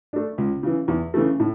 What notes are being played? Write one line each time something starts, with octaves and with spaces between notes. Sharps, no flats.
A3 D4
C#2
C#3 E3
E2
C#3 E3 A3
A2